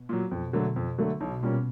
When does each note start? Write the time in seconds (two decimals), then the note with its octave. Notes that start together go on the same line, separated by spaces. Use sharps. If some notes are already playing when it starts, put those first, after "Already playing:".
Already playing: B2
0.09 A#2 F#3
0.31 F2
0.53 D3 F#3 A3
0.76 F2
0.98 D3 F#3 A3
1.21 B1 B2
1.43 A#2 G3 A#3 C#4